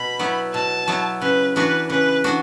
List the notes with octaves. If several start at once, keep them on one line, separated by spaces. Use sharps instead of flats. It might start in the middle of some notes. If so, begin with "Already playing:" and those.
Already playing: B2 B5
F#3 B3 E4
B2 A5
F#3 B3 E4
C#3 B4
E3 B3 D4 F#4 B4
C#3 B4
E3 B3 D4 F#4